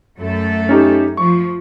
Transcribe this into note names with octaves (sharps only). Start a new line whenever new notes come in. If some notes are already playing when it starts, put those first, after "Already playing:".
F#2 A3 A4
C#4 D#4 G4
F3 C#6